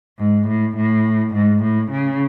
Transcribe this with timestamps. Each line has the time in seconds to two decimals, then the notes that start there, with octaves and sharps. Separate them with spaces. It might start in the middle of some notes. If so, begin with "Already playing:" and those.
0.19 G#2
0.47 A2
0.77 A2
1.34 G#2
1.62 A2
1.91 C#3